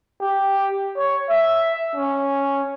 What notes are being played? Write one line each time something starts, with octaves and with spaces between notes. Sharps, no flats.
G4
C#5
E5
C#4